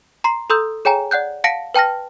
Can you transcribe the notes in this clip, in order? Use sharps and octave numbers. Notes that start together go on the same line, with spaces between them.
A#5 C6 C7
A4 A#5 C6 D#6 E6 G6
G#4 C#5 G5 G#5 A#5
D5 F#5 F#6 G6
F5 F#5 A5 A#6 C#7 D7
B4 G5 A5 F6 A#6